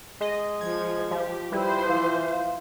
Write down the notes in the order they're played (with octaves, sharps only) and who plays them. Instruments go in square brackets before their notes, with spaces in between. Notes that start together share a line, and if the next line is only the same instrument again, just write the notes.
[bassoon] G#3 [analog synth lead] D#5
[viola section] F3 [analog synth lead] G#6
[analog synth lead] F3 [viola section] G4
[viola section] F3 C5 [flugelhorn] G3 [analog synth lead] E4 [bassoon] B4
[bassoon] E3 [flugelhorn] F5